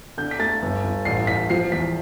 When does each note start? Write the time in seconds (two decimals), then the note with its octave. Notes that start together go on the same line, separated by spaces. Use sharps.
0.18 D3 G6
0.31 B6
0.39 A3 A6
0.62 G1
0.84 G1
1.05 A1 C7
1.27 A1 B6
1.50 F3 C7
1.72 E2 B6